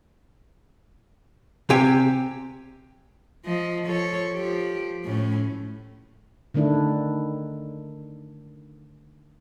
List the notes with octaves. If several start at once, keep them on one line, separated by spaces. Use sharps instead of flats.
C3 G4 G5 G#5
F3 D#5
F3 A4 C#5
F3 G4
A2 A3 C#4
D3 D#3 A3 D4 E4